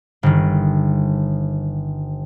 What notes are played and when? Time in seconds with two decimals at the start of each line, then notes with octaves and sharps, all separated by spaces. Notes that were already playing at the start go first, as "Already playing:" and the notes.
0.23 G1 D#3